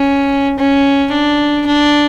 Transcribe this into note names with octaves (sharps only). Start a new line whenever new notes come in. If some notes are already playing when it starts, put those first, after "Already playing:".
Already playing: C#4
C#4
D4
D4